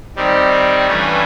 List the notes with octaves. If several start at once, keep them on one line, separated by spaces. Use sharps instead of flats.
D#3 G3 C4
G2 E3 A3 C#4